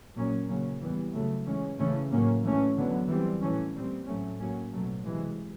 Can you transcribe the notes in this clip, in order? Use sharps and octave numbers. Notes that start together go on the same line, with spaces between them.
A#2 F#3 A#3 C#4
C#3 F#3 A#3 C#4
E3 G3 B3
C#3 F#3 A3
E3 G#3 C#4
C#3 E3 A3 C#4
A2 F#3 A#3 C#4
E3 A3 C#4
D3 F#3 B3
E3 G3 C4
A2 E3 A3 C#4
A#2 G3 C4
A2 F#3 A3 C#4
A2 F#3 A#3 C#4
B2 F#3 A3
C3 E3 G#3